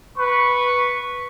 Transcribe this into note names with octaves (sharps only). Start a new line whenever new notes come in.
B4 C#6